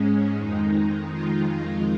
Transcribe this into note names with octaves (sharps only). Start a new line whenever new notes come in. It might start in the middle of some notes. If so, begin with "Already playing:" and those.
Already playing: G#2 G#3 C#4
F2 D#3 G#3 D#4
F4